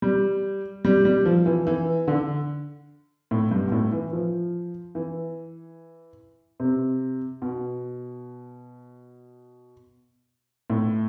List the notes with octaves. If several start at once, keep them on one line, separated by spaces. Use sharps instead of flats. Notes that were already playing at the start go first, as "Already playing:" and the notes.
G3
G3
G3
F3
E3
E3
D3
A2
G2
B2
A2
E3
F3
E3
C3
B2
A2